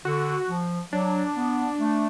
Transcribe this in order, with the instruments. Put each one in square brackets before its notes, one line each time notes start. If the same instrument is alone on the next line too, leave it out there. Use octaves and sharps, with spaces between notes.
[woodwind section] D3 [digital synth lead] F#4
[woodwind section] F3
[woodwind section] F#3 [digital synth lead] D4
[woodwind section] B3
A3